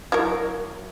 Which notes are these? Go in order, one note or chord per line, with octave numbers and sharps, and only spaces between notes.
F#3 E4 A#4